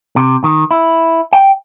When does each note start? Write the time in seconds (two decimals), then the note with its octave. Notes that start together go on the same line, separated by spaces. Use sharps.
0.16 C3
0.44 D#3
0.71 E4
1.33 G5